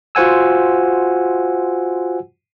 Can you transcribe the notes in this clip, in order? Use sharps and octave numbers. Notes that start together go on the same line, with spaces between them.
F4 F#4 C5 F#5 G#5 E6